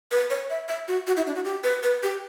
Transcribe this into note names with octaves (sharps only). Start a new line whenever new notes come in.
B4
C#5
E5
E5
F#4
F#4
E4
D4
F#4
G4
B4
B4
G4